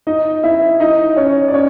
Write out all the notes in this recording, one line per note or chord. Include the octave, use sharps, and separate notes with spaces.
D#4 D#5
E4 E5
D#4 D#5
C#4 C#5
D5
C#4 C#5